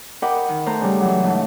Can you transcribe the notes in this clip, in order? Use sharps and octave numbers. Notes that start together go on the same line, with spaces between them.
A#4 D#5 F#5 G5 B5 D6
D#3
A3 A4 C5 A#5 F#6
C#3 G3
E3 F#3
G#2 C#3 A3